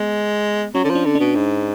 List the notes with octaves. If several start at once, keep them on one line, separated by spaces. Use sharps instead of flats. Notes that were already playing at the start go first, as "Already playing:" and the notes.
Already playing: G#3 B3
F#3 C#4
D3
F3
D4
D3
B2 D4
G#2